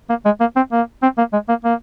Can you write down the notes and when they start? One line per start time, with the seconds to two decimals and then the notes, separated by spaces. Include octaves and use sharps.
0.09 A#3
0.25 G#3
0.40 A#3
0.56 C4
0.72 A#3
1.03 C4
1.18 A#3
1.33 G#3
1.49 A#3
1.64 A#3